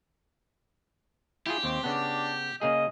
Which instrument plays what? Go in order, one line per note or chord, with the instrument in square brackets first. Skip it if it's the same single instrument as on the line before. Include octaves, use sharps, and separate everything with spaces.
[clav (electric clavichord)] E4 F4 G#4 [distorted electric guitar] G4
[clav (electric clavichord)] D#2 [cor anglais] C4
[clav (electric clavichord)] C#3 B3 [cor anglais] D4
[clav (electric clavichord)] C#3 A#3 G#4 [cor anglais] D#5